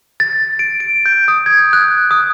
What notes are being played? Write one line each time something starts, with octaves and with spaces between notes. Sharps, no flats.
A6
D7
D7
G6
D#6
G#6
F#6
D#6